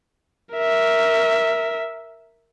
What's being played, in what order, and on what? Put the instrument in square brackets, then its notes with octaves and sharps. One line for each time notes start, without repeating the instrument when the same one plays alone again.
[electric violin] A#4 E5